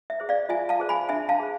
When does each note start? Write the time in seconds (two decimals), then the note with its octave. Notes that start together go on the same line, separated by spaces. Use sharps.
0.10 E5
0.20 G#4 C5
0.29 D5 F5
0.49 F4 E5 G#5
0.69 F5 A5
0.80 G#4 C5
0.89 G#5 B5
1.09 D4 E5 G#5
1.29 F5 A5
1.40 G#4 C5